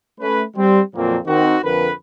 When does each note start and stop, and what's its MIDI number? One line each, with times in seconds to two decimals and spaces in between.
0.20 0.43 57
0.20 0.43 61
0.20 0.43 71
0.56 0.80 55
0.56 0.80 60
0.94 1.18 41
0.94 1.18 46
0.94 1.18 53
0.94 1.18 54
0.94 1.18 58
0.94 1.18 60
1.26 1.57 51
1.26 1.57 60
1.26 1.57 66
1.63 1.91 41
1.63 1.91 50
1.63 1.91 70
1.63 1.91 71